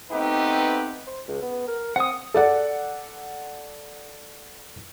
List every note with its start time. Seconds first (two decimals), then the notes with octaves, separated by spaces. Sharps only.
0.10 A3 B3 C4 D#4 G4 B4
1.07 C5
1.28 C#2
1.42 B3
1.67 A#4
1.96 C4 F#5 D#6
2.34 A4 D5 F#5